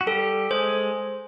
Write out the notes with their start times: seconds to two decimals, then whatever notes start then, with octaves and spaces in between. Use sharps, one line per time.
0.01 F#4
0.06 G3 G4 A4
0.51 G#3 G#4 C5